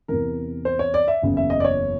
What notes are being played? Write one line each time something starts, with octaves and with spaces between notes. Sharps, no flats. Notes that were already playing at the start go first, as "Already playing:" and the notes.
E2 C3 E3 A#4
C5
C#5
D5
E5
F#1 E2 C#3
E5
D#5
D5
C#5